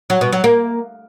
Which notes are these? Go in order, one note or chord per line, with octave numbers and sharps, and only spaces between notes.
F#3
B2
F#3
A#3